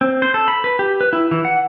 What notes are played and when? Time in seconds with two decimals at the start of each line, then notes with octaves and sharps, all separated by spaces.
0.01 C4
0.22 C5
0.34 A4
0.48 B5
0.64 B4
0.79 G4
1.01 B4
1.13 E4
1.31 E3
1.45 F#5